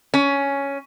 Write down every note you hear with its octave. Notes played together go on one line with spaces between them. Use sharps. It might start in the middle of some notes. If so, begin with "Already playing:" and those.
C#4